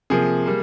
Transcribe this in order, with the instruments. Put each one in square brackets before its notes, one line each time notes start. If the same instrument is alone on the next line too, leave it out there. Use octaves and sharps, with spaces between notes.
[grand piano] C3 F3 A#3 G#4
G3 A#3